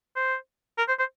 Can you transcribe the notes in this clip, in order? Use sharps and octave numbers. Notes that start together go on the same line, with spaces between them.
C5
A#4
C5
C5